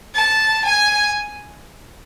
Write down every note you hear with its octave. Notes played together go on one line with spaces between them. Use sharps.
A5
G#5